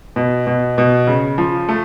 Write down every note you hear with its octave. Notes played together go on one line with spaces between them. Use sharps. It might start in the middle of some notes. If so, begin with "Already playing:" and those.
B2
B2
B2
C#3
F3
A3